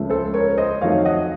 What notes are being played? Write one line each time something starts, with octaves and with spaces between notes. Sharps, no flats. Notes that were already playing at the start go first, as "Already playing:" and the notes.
Already playing: C#2 C#3 F3 A3
A4 C5
A#4 C#5
C5 D#5
F2 D#3 F#3 A3 C#5 F5
D#5 F#5